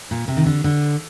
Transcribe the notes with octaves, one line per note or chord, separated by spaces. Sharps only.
A#2
C3
D#3
D3
D3